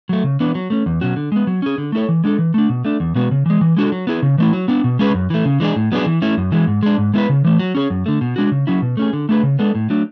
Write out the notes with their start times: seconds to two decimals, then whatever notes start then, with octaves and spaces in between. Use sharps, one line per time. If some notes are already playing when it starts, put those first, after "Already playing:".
0.09 F#3 A3
0.24 C#3
0.40 E3 B3 D4
0.55 F#3
0.70 A3 C#4
0.86 E2
1.01 B2 F#3 C#4 F#4
1.16 D3
1.32 G#3 B3
1.47 F#3
1.62 C#4 G#4
1.78 D3
1.92 A3 E4 A4 C#5
2.09 E3
2.24 G#3 D4 A4
2.38 E3
2.54 A3 D4
2.69 B2
2.85 A3 D4
3.00 E2
3.15 B2 G#3 B3 F#4
3.31 C#3
3.46 E3 G#3
3.61 E3
3.77 G#3 D4 F#4 A4
3.92 F#3
4.07 B3 E4 G#4
4.22 C#3
4.38 E3 A3 E4
4.53 F#3
4.68 B3 D4
4.84 B2
4.99 G#3 C#4 G#4 B4
5.14 F#2
5.30 E3 A3
5.45 C#3
5.60 E3 G#3 D4 G#4
5.76 A2
5.92 F#3 B3 D4 G#4
6.06 E3
6.22 A3 C#4 E4
6.37 F#2
6.52 E3 G#3
6.67 G#2
6.83 G#3 D4
6.98 G#2
7.14 G#3 B3 E4 B4
7.29 C#3
7.44 E3 A3
7.60 F#3
7.75 C#4 G#4 C#5
7.90 F#2
8.06 D3 A3
8.21 B2
8.36 G#3 D4 F#4
8.52 C#3
8.67 F#3 C#4 E4
8.82 B2
8.97 A3 C#4 G#4
9.13 D3
9.29 A3 D4 G#4 B4
9.43 C#3
9.59 G#3 B3 D4 A4
9.75 A2
9.90 F#3 A3 D4